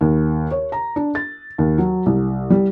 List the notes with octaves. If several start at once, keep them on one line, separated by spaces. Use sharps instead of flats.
D#2
C#5
A#5
D4
A6
D#2
F#3
C2
G3